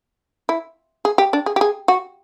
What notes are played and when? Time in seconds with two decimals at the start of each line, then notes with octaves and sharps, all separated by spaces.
0.49 E4
1.05 G#4
1.18 G4
1.33 D4
1.46 G#4
1.56 G4
1.61 G#4
1.88 F#4